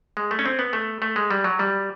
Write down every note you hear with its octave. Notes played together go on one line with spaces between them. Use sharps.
G#3
A3
C#4
C4
B3
A3
A3
G#3
G3
F#3
G3